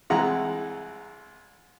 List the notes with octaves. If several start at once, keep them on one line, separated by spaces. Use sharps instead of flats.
C2 E3 G#3 F#5 A#5